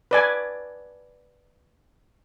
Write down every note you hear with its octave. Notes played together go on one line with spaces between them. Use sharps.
B4 D5 G#5